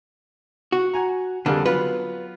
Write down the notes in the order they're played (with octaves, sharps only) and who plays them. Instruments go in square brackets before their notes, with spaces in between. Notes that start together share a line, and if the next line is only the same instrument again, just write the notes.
[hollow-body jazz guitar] F#4
[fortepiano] F#5 G#5 A#5
[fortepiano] F2 G3 G#4 [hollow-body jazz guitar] D3 A#3
[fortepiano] F#3 B3 F4 [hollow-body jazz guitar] B4